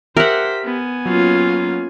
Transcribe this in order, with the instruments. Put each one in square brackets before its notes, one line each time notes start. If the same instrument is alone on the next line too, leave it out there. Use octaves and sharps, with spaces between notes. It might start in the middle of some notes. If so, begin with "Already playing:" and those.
[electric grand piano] G4 E5 [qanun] A#4 F#5 [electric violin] C5 B6
[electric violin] B3 G#5
[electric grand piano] F#3 [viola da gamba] A#3 C#4 F4